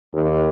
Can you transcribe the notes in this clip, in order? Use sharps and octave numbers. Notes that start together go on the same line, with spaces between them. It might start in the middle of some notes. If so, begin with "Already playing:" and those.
D#2